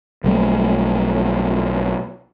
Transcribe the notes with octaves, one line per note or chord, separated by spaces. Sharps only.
B1 G3 A3 A#3